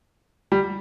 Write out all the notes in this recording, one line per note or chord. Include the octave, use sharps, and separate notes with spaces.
G3